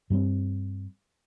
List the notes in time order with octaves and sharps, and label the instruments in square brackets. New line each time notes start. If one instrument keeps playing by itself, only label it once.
[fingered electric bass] G2 G3 B3 C4